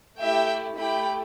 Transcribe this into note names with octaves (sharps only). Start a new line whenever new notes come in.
A3 E4 G4 E5 G5
A3 E4 G4 G5 B5